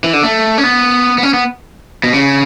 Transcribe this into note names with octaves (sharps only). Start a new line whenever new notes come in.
E3
D3
A3
C#4
B3
B3
C#4
B3
B2
C#3